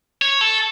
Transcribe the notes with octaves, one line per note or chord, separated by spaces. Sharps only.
C#5
A4